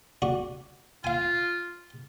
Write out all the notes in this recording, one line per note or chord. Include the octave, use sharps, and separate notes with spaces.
D4 F#4
F4 F5 G#5